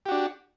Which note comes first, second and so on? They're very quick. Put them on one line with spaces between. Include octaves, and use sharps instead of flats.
G4 F#4 D4